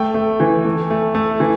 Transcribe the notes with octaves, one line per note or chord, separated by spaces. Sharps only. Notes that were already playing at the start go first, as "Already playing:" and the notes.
Already playing: A3 G5
A3
E3
A3
A3
A3
E3